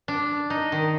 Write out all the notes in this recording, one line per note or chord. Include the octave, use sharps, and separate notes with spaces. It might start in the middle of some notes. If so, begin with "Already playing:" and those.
D4
D#4
D#3